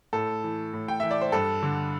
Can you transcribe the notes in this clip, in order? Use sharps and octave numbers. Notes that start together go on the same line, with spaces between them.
A2 A4
E3
A2
G5
E3 E5
D5
C5
G2 A4
D3